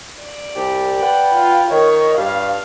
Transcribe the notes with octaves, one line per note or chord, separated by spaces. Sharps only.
D5
C2 G4
B4 F#5 G5
F4
D#3 C#5
G2 F5